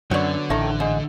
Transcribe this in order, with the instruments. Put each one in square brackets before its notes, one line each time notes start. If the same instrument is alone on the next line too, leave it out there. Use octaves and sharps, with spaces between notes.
[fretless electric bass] F#2 [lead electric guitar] D3 [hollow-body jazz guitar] F#3 B3 [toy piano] C#5 D5 C#6
[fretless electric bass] A1 [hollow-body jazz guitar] A2 D#3 [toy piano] E5
[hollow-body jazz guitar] G#2